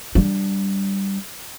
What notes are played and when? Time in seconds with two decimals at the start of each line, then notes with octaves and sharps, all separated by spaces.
0.15 G3 D4